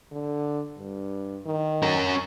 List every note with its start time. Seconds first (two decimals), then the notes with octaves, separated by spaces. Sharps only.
0.12 D3
0.78 G2
1.46 D#3
1.83 C#4 A#4